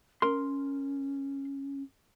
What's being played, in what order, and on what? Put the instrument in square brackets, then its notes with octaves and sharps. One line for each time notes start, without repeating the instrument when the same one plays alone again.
[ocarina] C#4 [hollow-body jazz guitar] A#4 C6